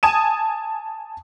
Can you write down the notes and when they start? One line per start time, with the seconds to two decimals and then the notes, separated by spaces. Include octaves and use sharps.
0.03 G#5 A5 D#6 D#7 E7